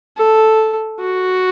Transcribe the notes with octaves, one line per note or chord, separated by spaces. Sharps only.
A4
F#4